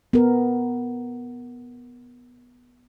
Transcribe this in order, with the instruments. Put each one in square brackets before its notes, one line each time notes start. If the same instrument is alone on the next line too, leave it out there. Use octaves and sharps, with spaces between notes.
[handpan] B3 A#4